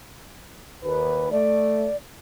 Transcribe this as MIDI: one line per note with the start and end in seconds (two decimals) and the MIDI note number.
0.83 1.29 39
0.83 1.29 71
1.31 1.87 57
1.31 1.96 74